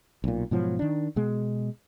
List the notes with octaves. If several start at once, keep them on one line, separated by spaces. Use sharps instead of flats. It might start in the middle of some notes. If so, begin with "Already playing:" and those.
B1 A#2
G#2 B2 F3 F#3
D#3 D4
B2 G#3